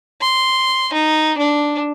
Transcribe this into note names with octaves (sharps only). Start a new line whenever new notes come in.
C6
D#4
D4